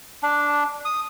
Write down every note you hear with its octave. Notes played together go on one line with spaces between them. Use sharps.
D4
D#6